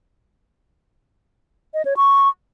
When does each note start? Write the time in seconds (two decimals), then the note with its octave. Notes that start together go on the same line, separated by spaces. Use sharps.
1.74 D#5
1.85 C#5
1.97 C#6